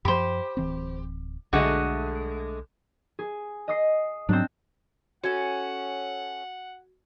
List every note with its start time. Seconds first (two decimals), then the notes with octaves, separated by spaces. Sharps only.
0.05 F#2 F3 G4 C5 B5
0.57 D1 E3 C4
1.53 B1 D3 G#3 A3 F#4 F#5
3.19 G#4
3.68 D#5 D#6 C7
4.29 G#2 F#3 C4 D4
5.24 C#4 F#4 A4 F#5 G#6